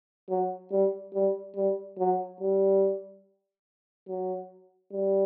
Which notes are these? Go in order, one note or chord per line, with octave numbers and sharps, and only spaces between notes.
F#3
G3
G3
G3
F#3
G3
F#3
G3